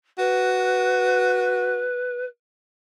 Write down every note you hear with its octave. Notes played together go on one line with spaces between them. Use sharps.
F#4 B4